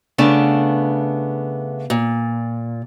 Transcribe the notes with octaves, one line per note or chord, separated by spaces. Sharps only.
C#3 A3 B3 D4
A#2